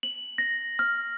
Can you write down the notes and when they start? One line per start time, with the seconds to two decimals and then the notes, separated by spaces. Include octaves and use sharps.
0.03 F#7
0.38 A#6
0.79 F6